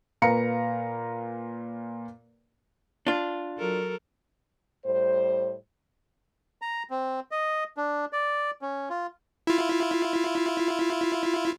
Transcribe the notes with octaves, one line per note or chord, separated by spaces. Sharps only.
A#2 B4 F5 A#5 C#7
D4 F4
F#3 A4 A#4
A2 G3 C5
A#5
C4
D#5
D4
D5
C#4
F4
E4 F4